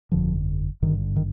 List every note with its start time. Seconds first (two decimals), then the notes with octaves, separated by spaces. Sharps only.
0.12 G1 F2 D3 F3
0.82 G#1 G2 D3 D#3
1.16 D#3